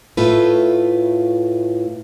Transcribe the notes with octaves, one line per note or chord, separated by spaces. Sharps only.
A2 A3 F4 B4